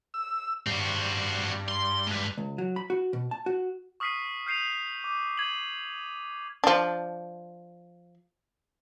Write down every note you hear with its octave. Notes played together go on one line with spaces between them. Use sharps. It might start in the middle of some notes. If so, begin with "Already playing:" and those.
E6
G2 C4 F#4
C6
G#3 B4
C#2
F#3
B5
F#4
B2
A5
F#4
C#6 D#6 F6 B6 C7 D#7
F6 G6 C7 D#7 F7
D6
G#6 D#7 F#7
F3 D4